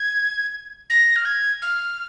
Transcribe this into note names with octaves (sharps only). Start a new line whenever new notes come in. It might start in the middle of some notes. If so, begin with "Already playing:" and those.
Already playing: G#6
A#6
F6
G#6
F6